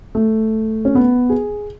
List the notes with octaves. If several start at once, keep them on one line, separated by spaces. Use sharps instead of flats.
A3
C#4
B3
G#4